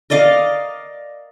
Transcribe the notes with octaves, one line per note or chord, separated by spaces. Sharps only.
A#4 D5 D#5 F5